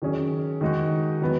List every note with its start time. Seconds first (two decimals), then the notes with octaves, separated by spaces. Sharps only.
0.02 D#3 F#3 C#4 G#4
0.61 D#3 G#3 D#4 F#4
1.21 D#3 F#3 B3